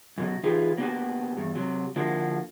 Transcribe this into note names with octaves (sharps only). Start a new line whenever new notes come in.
F#2 B2 F#3
E3 D#4 F4 G4 G#4 B4
F#3 A#3 B3 D4 F#4 G4
E2 G2
C3 F#3
D3 F3 A#3 D4 E4 F#4